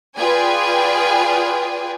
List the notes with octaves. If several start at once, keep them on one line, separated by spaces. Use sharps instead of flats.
F4 G#4 B4 D5 G5 G#5